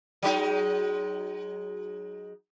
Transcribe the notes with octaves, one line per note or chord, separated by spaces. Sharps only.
F#3 G#3 D#4